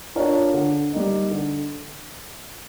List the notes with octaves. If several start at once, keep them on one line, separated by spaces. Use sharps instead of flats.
D4 F4 A#4 C#5
D3
G3 A#3 D#4
D3